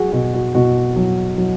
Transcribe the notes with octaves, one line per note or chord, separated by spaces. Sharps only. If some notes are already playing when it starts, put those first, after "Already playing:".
Already playing: F#3 F#4 G#4
B2 F#4
F#4
B2 F#4
F#3
F#3